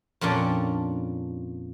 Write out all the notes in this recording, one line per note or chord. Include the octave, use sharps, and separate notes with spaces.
F2 A#2 C#4 D4